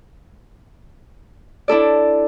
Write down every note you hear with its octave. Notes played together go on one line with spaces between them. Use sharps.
D4 E4 A4 D5